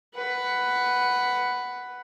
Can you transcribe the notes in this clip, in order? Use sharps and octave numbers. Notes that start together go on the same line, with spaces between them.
B4 F#5